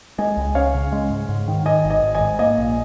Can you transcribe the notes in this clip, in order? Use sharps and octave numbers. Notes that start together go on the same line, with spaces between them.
G#3 D#5 G#5
C#2
C#4 C#5 F5
C#3
G#3
G#2
G#2
D#3
D#3 D#5 G#5
G#1
D#5 G#5
G#1
D#5 G#5
G#2
A#3 D#5 G#5
A#1